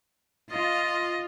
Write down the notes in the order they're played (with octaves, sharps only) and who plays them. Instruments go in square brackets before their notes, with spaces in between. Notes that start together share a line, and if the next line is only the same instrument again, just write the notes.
[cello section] F4 [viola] D#5